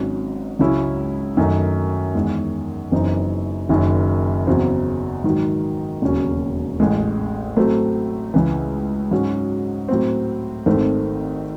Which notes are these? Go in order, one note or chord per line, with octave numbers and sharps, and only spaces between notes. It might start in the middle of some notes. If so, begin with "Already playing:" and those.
Already playing: G#1 G#2 F#3 C#4
C#2 C#3 F#3 C#4 E4
F#2 D#3 A3 D#4
E2 D#3 G#3
F#1 F#2 E3 C4 D#4
F#1 F#2 D#3
E2 C#3 F#3 C4
G#2 D#3 F#3
E1 D#2 C#3 F#3 C#4
A1 A2 G#3
A2 F#3 A3 C4
C#2 C#3 E3
G#2 F#3 C#4 F#4
A2 F#3 C4
G#1 G#2 D#3 A3 C4